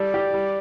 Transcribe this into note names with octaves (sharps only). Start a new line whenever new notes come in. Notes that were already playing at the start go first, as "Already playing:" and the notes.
Already playing: G3 A4 D5
G4
G3